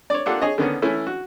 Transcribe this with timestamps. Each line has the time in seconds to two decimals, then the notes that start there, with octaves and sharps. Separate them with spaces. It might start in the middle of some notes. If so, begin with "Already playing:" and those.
0.10 C#5 D5
0.26 A#3 D4 F4 G4 A4 F#5
0.42 G#4 C#5 D#5
0.58 D3 D#3 B3 C#4
0.82 E3 A3 C#4 E4
1.07 F#4